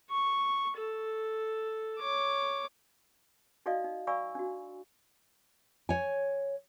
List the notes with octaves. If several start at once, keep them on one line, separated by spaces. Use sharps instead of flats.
C#6
A4
C#5 D6
D#4 F#4 A4 D5 D#5 F5
D#4
D5 F5 G#5 B5 C#6 E6
D4 F#4
C#5 G#5